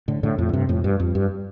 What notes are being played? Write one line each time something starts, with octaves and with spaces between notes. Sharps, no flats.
A2 D3
A2 D3
F2 A2
D3
G2 C3
F2 A2
G2
F2
G2